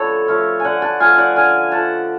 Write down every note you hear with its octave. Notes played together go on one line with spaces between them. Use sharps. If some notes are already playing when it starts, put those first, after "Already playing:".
Already playing: D3 F3 A3 A4 B4 C#5
F3 A3 C#5 F5
D3 D5 F#5 G#5
F#5 A5
F3 A3 F5 G#5
D5 F#5
D3 F5 G#5
F3 A3 F#5 A5